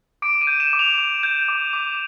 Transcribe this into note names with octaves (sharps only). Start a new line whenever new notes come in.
D6 D7
D#7
G6
E7
D6
F7
D6
G6
D6
D6